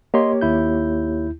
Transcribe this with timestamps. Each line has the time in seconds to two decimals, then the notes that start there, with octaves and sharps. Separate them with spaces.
0.14 A#3 G4 C#5 D#5 C6
0.41 D#2 E4 G6